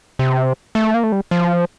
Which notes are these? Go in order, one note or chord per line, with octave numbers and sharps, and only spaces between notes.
C3
A3
A#3
A3
G3
F3